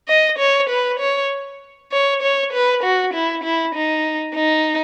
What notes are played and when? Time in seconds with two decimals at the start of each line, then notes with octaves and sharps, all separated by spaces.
0.08 D#5
0.39 C#5
0.70 B4
1.00 C#5
1.92 C#5
2.22 C#5
2.53 B4
2.83 F#4
3.14 E4
3.44 E4
3.75 D#4
4.35 D#4